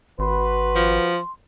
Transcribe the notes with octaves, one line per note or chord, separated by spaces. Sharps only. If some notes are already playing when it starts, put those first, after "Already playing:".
G#1 F#4 B4 C6
F3